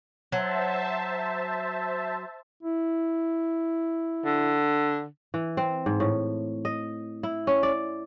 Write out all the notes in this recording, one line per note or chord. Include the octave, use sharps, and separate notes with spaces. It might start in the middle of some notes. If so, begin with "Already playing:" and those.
F#3 C5 E5 A5
E4
D3
E3
C4
G#2
A2
D#5
E4
C#4
D5